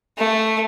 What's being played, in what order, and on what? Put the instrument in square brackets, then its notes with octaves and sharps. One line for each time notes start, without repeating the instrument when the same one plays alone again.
[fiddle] A3